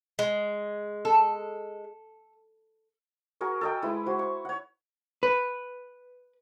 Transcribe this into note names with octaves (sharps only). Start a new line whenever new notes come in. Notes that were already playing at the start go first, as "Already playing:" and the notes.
G#3
A4
F#4 G#4 A#4 C#6
A4 D#5 G5
G#3 E4 B4
F#4 C5
C#6
C#5 F#5
B4